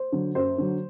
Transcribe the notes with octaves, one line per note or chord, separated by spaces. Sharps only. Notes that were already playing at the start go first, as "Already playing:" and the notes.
Already playing: C5
D3 F#3
F#2 C5
D3 F#3